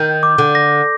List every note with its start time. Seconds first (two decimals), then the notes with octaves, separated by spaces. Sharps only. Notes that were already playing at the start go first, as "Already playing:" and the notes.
Already playing: D#3 G6
0.23 D6
0.38 D3
0.55 A#6